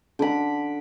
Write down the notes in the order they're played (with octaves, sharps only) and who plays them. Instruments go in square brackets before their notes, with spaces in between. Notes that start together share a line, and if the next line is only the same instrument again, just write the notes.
[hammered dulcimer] D3 B5